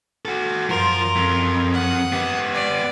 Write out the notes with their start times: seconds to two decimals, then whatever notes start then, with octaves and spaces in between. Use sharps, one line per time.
0.25 F#4 A4
0.69 F#2 F3 F4 A#4 C5
1.16 F2
1.74 F#5 D#6
2.12 B3 G4
2.54 D5